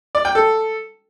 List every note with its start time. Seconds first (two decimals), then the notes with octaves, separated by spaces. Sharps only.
0.15 D5
0.25 G5
0.35 A4